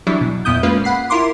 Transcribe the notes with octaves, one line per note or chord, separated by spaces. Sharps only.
E3 F#3 G3 D4 E4
B2
F2 A#2 B3 E4 D#6 G6
G#3 A#3 C#4 F4 B4
F#5 B5 C7
E4 F4 A#4 C6 D6